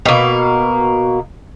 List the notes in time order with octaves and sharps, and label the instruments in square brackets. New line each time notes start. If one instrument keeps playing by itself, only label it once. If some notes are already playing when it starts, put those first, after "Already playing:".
[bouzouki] B2 A#3